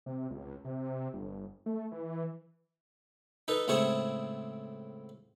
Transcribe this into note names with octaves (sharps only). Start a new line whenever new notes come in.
C3
C#2
C3
G1
A3
E3
D#4 A4 B4
C#2 A2 C4 E4 G#4 C#6